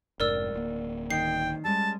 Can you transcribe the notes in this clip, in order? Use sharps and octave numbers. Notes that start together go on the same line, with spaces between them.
F1 G#2 D4 A#4 D5 E6
D1 A#3
D#3 G5 C7
G3 G#3 C#4 A5